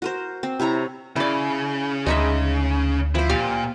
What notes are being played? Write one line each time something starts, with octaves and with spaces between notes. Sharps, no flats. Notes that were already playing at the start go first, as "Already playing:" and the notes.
F#4 A#4 C5
C4
C3 E4 C#5 A#5
C#3 E4 D5
D2 C#3 G#3 D#4 E5
F3 E4 C5
A#2 G4 F5